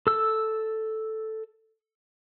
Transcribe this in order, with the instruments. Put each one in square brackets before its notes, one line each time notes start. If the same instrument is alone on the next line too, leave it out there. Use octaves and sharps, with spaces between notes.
[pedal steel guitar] A4 E6